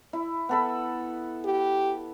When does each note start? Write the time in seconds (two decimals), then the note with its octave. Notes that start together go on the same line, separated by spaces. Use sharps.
0.13 E4
0.49 B3 A4 B5
1.45 G4